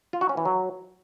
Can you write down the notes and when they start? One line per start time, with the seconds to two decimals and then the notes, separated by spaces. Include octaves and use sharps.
0.13 F4
0.21 F#4
0.29 C#4
0.37 E3
0.45 F#3